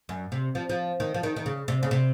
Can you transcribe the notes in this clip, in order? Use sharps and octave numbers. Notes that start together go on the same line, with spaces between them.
F#2
C3
F3
F3
D#3
F3
D#3
D#3
C#3
C3
C#3
C3